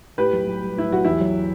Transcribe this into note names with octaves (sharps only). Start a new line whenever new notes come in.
A2 G4 B4
B1
B1
G3
A2 E4
B1 F#4
E2 E4 G4
F#3